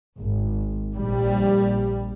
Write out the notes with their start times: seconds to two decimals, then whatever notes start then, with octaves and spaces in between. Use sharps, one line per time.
0.18 G#1
0.94 A#1 G3